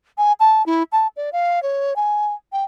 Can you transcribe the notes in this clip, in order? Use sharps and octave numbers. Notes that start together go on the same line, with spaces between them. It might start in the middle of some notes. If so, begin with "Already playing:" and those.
G#5
A5
E4
A5
D5
F5
C#5
G#5
G5